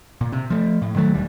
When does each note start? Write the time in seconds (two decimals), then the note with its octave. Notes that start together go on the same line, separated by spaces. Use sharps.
0.21 A#2
0.32 C3
0.50 F3 A3
0.82 A2
0.96 D#3 F#3 A3
1.14 E1 D2 G3